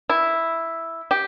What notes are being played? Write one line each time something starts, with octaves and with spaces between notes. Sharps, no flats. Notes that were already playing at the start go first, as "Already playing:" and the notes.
E4
G4